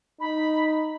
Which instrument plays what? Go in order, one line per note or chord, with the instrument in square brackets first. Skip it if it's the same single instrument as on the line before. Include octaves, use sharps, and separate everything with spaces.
[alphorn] D#4 [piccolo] B5